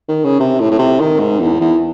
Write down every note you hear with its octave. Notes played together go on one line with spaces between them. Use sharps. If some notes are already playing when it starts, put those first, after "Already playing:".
D#3
C#3
C3
A2
A2
C3
D#3
G#2
E2
E2